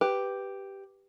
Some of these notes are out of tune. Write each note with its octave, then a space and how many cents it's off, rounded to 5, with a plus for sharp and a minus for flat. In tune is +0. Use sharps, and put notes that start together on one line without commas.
G4 +0 B4 +0